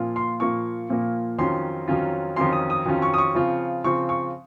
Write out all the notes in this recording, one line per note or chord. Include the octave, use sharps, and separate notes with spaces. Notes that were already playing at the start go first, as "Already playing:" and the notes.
Already playing: A#2 F3 A#3 F4
C6
A#2 F3 A#3 F4 C#6
A#2 F3 A#3 F4
F2 D#3 F#3 C#4 F4 C6
F2 D#3 F#3 C#4 F4
F2 D#3 F#3 C#4 F4 C6
D#6
D#6
F2 D#3 F#3 C#4 F4
C#6
D#6
C#6
C#3 F3 C4 F4
C#3 F3 C4 F4 C#6
C#6